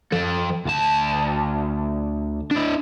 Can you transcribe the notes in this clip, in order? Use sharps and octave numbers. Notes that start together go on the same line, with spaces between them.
F3 A4
D2 A5
D4 E4